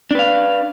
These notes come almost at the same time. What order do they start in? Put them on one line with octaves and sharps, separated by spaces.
D4 B4 F5